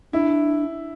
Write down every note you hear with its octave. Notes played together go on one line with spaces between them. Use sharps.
D4 E4